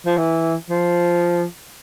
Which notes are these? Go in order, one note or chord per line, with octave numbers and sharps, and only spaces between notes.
F3
E3
F3